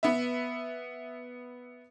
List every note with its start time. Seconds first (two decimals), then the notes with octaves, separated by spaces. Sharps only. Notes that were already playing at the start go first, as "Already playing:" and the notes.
0.03 B3 B4 E5